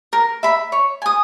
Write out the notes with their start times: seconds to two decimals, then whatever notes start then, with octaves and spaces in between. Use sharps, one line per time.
0.13 A#4
0.43 E5 B5
0.72 C#5
1.02 G#5 D#6